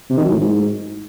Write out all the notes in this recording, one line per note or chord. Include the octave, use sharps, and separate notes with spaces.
C3
D#3
F#3
A2
G#2